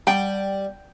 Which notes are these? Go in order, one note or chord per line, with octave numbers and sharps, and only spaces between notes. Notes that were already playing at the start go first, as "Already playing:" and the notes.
G3 G5